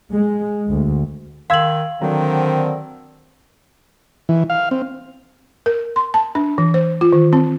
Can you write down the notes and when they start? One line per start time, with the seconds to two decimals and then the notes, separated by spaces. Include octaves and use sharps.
0.11 G#3
0.70 D2
1.50 D#3 F5 C6 E6 G#6 F#7
2.02 D3 D#3 F#3 C4
4.29 E3
4.50 F5
4.71 C4
5.66 A#4
5.96 C6
6.14 A5
6.35 D4
6.58 E3
6.74 C5
7.01 F4
7.13 D#3
7.33 C4